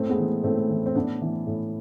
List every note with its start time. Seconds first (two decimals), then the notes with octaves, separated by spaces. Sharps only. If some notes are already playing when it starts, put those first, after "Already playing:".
Already playing: A2 A3 C4
0.09 G#3 B3
0.18 E3
0.44 A2 A3 C4
0.69 E3
0.86 C4
0.95 A2 B3 D4
1.22 E3
1.47 A2